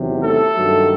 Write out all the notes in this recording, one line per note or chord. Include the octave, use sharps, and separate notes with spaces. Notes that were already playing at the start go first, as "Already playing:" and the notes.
Already playing: E2 C3 D#3 F#3
A3 A4
G2 D#3 F#3